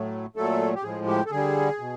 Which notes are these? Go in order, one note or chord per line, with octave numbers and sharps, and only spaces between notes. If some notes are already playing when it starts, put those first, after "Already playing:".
Already playing: A2 F#3 A3
A#2 F#3 A3 A4
G4
A2 F3 G#3 G#4
G4
A4
D3 G3 G#4
B2